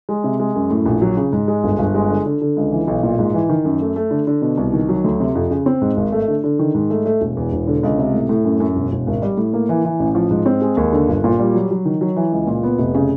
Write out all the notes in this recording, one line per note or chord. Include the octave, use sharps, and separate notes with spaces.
G#3
C3
G#3
F#2
A2
A#1
F#3
C#3
G#2
G#3
G1
G1
G#3
D3
D3
D3
C#2
E3
B1
A#2
G#2
E3
D#3
F#2
A3
A3
D3
D3
B2
C2
D#3
F#3
D2
C3
F2
C#3
C4
G#2
G#1
A3
D3
D3
D#3
G#2
A3
A3
E1
E2
E1
D3
C#2
C3
A2
A2
F#2
F#2
E1
E1
G#1
G3
A2
A#3
E3
E3
A1
F3
G#2
C4
G#3
D#2
D3
G1
A#2
G3
F#3
F#3
D#3
F#3
E3
C#2
A#2
B3
F1
C#3